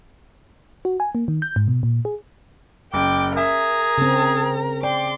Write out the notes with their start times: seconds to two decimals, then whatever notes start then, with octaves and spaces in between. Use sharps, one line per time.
0.85 F#4
1.00 G#5
1.15 A#3
1.28 D#3
1.42 G6
1.56 G#2
1.68 B2
1.83 A#2
2.05 G#4
2.94 F#1 G5 D6
3.37 G#4 A#4 E5 A#5
3.98 C#3 C4
4.83 D5 G5 C6 D6